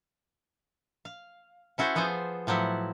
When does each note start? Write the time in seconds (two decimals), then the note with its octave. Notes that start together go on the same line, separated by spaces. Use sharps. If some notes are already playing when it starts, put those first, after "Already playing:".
1.05 F5
1.78 C#4 E4 F#4 A4 C5
1.95 F3 B3 G#4 A4 C5
2.47 A2 F3 F#3 E4 F#5